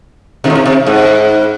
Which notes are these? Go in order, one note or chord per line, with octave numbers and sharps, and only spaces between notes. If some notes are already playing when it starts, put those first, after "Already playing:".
C3 D#3
A2
C3
C3
G#2